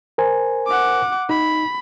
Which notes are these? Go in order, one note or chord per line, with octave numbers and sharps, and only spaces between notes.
A#4 C5 G#5
F#5 D6
D#4 B5